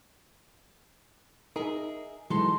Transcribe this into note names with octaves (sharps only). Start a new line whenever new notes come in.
D#4 G#4 A#4 E5
E3 F#3 G#3 D#4 A4 C6